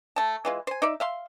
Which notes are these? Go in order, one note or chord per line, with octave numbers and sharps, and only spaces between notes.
A3 A5
E3 G#3 F4
C5 G#5
D#4 D5 E5
E5 F5 C6